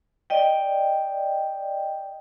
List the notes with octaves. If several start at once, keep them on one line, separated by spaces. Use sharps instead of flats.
D5 D#5 G5